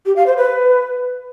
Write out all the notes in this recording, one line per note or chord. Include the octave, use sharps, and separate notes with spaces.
G4
F5
C5
B4